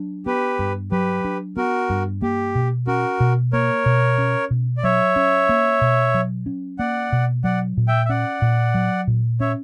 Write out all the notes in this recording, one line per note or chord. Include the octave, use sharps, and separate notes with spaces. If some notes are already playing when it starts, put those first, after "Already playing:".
Already playing: F#3 D4
B3 G4 B4
G2
F#3 G4 B4
D4
B3 F#4 A#4
G2
A#3 G4
B2
C#4 F#4 A#4
B2
A#3 A#4 C#5
B2
C#4
B2
D5
F#3 C#5 E5
C#4
A#3
B2
F#3
C#4
A#3 D5 F#5
B2
F#3 D5 F#5
A#2
E5 G5
E5
C#4 D5 F#5
A#2
F#3
A#2
C#4 C#5 E5